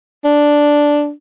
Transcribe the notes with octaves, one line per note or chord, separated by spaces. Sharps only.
D4